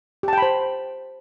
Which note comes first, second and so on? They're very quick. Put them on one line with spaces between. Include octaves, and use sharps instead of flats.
G4 A5 G5 B5 C5